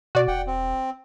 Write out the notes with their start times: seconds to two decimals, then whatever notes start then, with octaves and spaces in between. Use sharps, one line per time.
0.15 B2 F#4 D5
0.28 E1 F#5 G5
0.47 C4